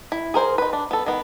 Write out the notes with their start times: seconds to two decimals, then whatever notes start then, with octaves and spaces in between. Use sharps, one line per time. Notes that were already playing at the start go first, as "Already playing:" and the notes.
0.12 E4
0.34 G#4 A#4 C5
0.58 D#4 B4
0.73 D4
0.91 B3 A4
1.06 D#3 B3